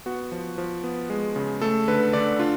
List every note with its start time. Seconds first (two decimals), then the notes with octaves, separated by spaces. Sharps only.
0.06 B3 F#4
0.32 F3
0.58 F3
0.84 B3
1.10 G#3
1.36 C#3
1.62 A3 A4
1.88 D3 B4
2.13 D3 D5
2.39 D4 F4